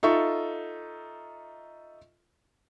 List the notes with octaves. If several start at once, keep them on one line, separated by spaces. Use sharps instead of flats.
D#4 F4 A4 E5 C#6